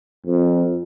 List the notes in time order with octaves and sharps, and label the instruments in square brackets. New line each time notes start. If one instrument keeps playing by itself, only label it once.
[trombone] F2